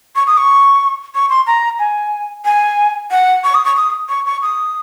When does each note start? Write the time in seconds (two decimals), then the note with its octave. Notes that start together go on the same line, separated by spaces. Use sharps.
0.16 C#6
0.27 D#6
0.38 C#6
1.15 C#6
1.30 C6
1.47 A#5
1.79 G#5
2.45 G#5
3.11 F#5
3.44 C#6
3.55 D#6
3.65 C#6
3.76 D#6
4.09 C#6
4.26 C#6
4.42 D#6